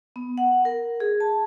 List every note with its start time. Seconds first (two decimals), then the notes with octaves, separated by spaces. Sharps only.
0.16 B3
0.38 F#5
0.65 A#4
1.00 G#4
1.20 A5